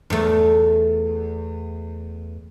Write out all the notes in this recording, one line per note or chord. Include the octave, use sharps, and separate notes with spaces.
E2 A3